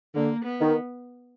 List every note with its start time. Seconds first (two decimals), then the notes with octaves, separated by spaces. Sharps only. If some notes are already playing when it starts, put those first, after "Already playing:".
0.15 D3 A#3
0.45 B3
0.61 D#3